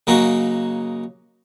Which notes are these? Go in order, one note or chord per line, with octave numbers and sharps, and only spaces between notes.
C#3 F#3 A#3 D#4 F#4